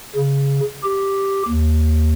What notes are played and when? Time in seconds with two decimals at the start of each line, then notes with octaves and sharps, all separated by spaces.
0.16 C#3
0.83 G4
1.48 D#2